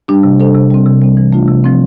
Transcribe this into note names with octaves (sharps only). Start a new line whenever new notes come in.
G3 D4 G4
C3
G3 D4 A4 C5
C3
G3 C4
C3
G3 C4
E3
A3 D4 F4
C3
F3 C4